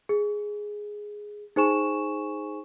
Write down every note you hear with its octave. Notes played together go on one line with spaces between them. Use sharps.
G#4
D#4 G#4 C5 G#5 C#6 E7